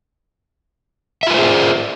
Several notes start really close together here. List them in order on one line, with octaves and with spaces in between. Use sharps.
E5 F4 B4 C5 G#4